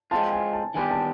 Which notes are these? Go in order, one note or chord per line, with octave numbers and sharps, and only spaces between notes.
G#3 C4 F4 A5
G#5
A5
D#3 G3 B3 E4 G4 G#5
A5